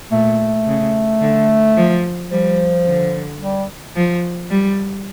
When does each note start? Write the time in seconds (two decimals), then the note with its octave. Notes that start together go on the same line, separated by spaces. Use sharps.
0.12 A#2 A3
0.67 C#3
1.21 D3
1.77 F3
2.30 F3 G3
2.86 D3
3.40 G3
3.96 F3
4.50 G3